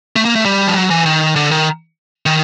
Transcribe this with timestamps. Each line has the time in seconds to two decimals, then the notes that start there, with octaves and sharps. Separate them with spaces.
0.16 A3
0.25 A#3
0.35 A3
0.45 G3
0.67 F3
0.75 F#3
0.90 E3
1.06 D#3
1.36 D3
1.51 D#3
2.26 D#3